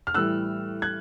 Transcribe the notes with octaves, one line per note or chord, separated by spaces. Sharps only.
F6
A2 E3 G3 E6 F#6
F#6 G#6